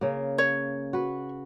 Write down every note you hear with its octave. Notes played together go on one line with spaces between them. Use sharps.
C#3 A#3
C#5
F#4 B4